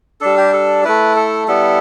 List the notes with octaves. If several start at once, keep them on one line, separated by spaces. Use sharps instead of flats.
G3 D4 A4
G4
A4
A3 E4 B4
A4
G3 B3 E4 A4